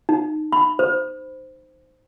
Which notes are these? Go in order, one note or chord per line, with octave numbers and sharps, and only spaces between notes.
D#4
B5
C5